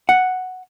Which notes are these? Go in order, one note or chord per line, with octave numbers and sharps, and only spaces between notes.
F#5